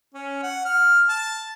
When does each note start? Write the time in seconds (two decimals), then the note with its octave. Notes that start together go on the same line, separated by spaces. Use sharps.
0.14 C#4
0.43 F#5
0.65 F6
1.09 A5